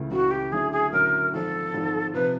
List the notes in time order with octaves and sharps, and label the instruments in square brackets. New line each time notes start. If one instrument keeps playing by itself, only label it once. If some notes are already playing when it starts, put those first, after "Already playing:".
Already playing: [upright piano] C#2 C#3 E3 A3
[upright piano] C#2 C#3 E3 A3 [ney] F#4
[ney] G4
[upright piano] D3 F#3 A3 C#4 E4 [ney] G#4
[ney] G#4
[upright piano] D3 F#3 A3 C#4 E4 [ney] A#4
[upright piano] G#1 G#2 F3 [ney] A4
[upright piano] G#1 G#2 F3
[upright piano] C3 F3 [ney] B4